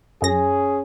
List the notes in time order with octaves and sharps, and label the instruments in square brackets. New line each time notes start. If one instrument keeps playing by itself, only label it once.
[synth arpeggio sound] F#2 A#6 [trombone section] C#4 G#4